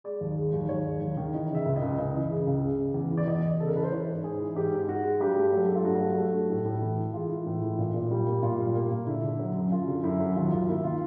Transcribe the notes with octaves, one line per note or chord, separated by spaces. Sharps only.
G#3 D5
D#2
G#3
D#2
D#2 C#5
G#3
D#2
D#3
E3 D#5
C#3 E5
C#2
D#5
C#2
C#2 D#5
E3
C#3
C#2
C#3
C#3
E2
E3
D5
E2 D#5
E2
C#3 A4
A#4
E3 B4
C5
E3 C#5
G#2
G#2 G#4
E3
G#2 G4
G#2
G#2 F#4
G#3
G2 G4
A3
F#3
A3
F4
G2 F#4
F#3
A3
G2
A2
A2
E3
E3
G#3 F4
E3
A2
E3
A#2
A#2
G3
A#3
A#2 F4
G3
A#3
A#2
D3 E4
D3
F#3
F#2
F#2 F4
D3
F#2 E4
F#3
D#2 F4
D#2 F4
A#3 E4
D#3 F4